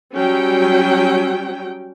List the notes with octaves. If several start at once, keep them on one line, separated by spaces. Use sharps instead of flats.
F#3 G3 C#4 G5